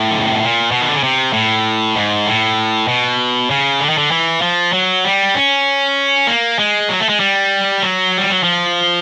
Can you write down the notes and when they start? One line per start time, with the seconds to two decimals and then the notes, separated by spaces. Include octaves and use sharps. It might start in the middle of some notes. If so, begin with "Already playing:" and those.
Already playing: A2
0.10 D3
0.17 C#3
0.26 C3
0.34 B2
0.41 A#2
0.71 B2
0.81 D#3
0.88 D3
0.95 C#3
1.04 C3
1.33 A2
1.96 G#2
2.26 A2
2.88 B2
3.50 C#3
3.80 D3
3.90 D#3
3.98 D3
4.11 E3
4.42 F3
4.73 F#3
5.05 G3
5.35 C#4
6.27 A#3
6.59 G#3
6.89 F#3
7.00 A3
7.09 G#3
7.20 G3
7.82 F#3
8.18 G3
8.30 F#3
8.43 F3